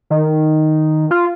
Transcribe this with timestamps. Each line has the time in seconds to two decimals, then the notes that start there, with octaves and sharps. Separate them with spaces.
0.10 D#3
1.11 F4